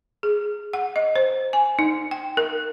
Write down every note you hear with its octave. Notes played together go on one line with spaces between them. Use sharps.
G#4
F#5
D#5
C5
G#5
D#4
G5
A#4